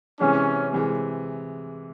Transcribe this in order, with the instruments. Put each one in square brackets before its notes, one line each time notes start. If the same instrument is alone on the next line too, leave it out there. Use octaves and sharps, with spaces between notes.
[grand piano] C3 E3 G#3 [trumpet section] C#4
[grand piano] C3 E3 G#3